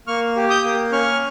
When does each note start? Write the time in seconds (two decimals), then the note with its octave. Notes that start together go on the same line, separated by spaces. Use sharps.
0.07 A#3 C#6 F6
0.36 G4
0.50 D#6 G6
0.64 A#3
0.92 C#4 C#6 F6